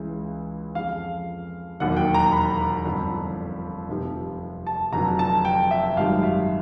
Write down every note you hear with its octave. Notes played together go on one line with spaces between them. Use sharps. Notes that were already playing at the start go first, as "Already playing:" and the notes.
Already playing: C#2 C#3 E3
F2 C#3 F3 F5
E1 D#2 D#3 F#3 F#5
G5
A#5
B5
G1 F2 D3
F1 F2 C3 F3
A5
F1 F2 D3 F#3 A#5
A5
G5
E5
G#1 F#2 D#3 G3 F5
E5